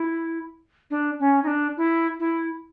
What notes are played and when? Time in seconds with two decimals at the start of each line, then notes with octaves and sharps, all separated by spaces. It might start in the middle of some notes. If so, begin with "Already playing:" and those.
Already playing: E4
0.91 D4
1.20 C#4
1.43 D#4
1.48 D4
1.77 E4
2.20 E4